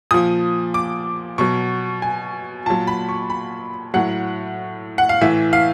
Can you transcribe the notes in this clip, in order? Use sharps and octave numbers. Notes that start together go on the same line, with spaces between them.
A#2 F3 D#6
D6
B2 F#3 C#6
G#5
A#2 F#3 A5
B5
C#6
B5
A2 F#3 F#5
F#5
F5
A2 E3 E5
F5